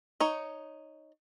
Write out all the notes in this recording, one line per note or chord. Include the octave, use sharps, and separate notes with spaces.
D#4 C#5